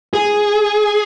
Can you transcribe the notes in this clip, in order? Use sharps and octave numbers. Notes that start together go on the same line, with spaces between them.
G#4